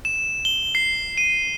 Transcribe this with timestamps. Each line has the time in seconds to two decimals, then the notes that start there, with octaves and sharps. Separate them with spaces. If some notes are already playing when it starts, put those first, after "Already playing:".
0.05 E7
0.45 G7
0.75 C7
1.18 D#7